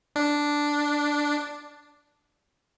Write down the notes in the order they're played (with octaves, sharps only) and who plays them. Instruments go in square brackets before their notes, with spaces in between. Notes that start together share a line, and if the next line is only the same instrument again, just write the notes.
[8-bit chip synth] D4